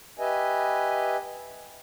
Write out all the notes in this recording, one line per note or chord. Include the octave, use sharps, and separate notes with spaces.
G4 B4 D#5 E5 G#5